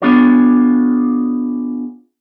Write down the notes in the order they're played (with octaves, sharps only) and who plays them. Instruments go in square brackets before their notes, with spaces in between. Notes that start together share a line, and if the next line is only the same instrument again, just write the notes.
[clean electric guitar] B3 D4 F4 G#4 C#5